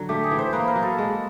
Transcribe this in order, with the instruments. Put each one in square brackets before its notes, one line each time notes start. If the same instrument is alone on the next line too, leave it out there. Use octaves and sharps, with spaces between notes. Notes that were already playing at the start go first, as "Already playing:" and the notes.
Already playing: [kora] D3 F#3
[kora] A3 [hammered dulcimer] G4
[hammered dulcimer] G#4
[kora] E3
[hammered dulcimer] C5
[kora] A#3 [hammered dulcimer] B4
[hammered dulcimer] A#4
[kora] F#3
[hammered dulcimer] A4
[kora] G#3